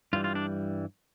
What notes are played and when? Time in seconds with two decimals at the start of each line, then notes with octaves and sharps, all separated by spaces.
0.13 G2 E3 G3 F4
0.24 F4
0.35 D4